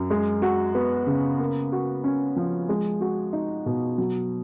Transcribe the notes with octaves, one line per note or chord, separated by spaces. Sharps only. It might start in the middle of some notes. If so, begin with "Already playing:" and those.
Already playing: F#2
G#3
F#4
B3
C#3
A#3
F#4
C#4
F3
G#3
F#4
D#4
B2
F#3